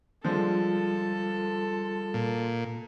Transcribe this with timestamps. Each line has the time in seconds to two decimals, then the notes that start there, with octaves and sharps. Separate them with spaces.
0.24 D3 F3 G3 G#3 F4 A4
2.14 A#2